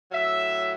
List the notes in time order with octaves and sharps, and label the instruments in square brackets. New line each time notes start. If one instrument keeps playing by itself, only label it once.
[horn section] A2 F#3 E5